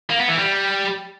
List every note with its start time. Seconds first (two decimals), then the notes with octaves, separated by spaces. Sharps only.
0.10 A#3
0.19 B3
0.28 E3
0.37 G3